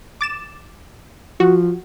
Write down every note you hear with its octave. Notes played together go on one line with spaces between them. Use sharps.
D6 A6 E7
F3 F#4